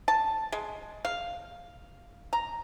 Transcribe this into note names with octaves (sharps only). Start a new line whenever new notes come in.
A5
G#3
F5
A#5